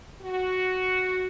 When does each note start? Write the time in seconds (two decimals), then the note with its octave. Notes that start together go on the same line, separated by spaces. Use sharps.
0.21 F#4